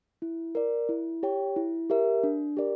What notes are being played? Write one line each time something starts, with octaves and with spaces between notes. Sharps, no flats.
E4
A#4 D5
E4
G4 C#5 G5
E4
G4 A#4 E5
D4
G4 A#4 D5